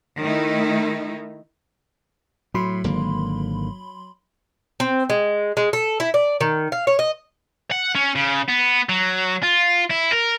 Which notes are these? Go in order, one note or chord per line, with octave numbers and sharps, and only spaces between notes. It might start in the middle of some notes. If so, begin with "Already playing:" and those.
D#3 A3 D#4 E4
A2 F#3 B5 C6
G#1 D3 A#3
C4
G#3
G#3
A4
E4
D5
D#3
F5
C#5
D#5
F#5
C#4
C#3
B3
F#3
F4
E4
A#4